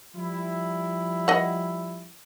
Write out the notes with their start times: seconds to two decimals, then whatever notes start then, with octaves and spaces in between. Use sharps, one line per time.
0.15 F3 G3 E4
1.28 D#5 F#5